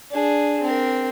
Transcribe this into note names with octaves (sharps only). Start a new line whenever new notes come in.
D4 G#4
C4 A#4